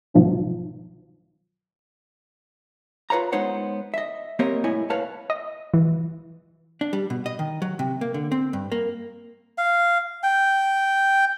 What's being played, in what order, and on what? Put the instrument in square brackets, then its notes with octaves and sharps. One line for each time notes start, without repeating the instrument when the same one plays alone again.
[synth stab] C2 G#2 B2 D#3 F3 F#3
[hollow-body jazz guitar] F4 B4 C#5 F5 A#5
G#3 B3 D#4 C5 C#5 F#5
D#5 E5
A#3 C4 G4 A#4 C#5 D#5
C2 A2 E4 C#5 D#5 G#5
B4 C#5 F5 A5
[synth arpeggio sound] D#5
E3
[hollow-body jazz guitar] D4
G3
B2
D#5
D#3
F#3
C3
A#3
D3
C4
G2
A#3
[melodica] F5
G5